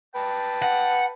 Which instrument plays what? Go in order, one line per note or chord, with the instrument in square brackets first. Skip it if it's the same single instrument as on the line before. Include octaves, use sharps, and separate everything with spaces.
[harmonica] B4 G5 A5
[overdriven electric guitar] F#5